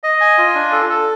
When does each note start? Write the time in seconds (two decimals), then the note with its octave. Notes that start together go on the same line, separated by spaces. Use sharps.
0.04 D#5
0.21 G#5
0.38 F4
0.55 D4
0.72 A4
0.89 A4